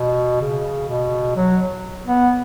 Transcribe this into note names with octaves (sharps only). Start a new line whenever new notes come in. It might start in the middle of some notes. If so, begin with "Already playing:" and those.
Already playing: B2
C#3
B2
F#3
B3